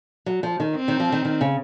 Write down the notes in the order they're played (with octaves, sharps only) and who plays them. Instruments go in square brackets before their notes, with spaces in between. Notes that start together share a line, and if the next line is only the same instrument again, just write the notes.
[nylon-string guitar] F#3
F3
D#3
[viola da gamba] C4
[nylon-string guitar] D#3
F3
D#3
D#3
C#3